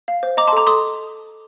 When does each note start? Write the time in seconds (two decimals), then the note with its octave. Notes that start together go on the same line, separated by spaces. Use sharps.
0.08 F5
0.23 C5
0.37 D#5 A#5 D6
0.48 A5 C6
0.53 A4 A#5 D6
0.67 A4 C6 D#6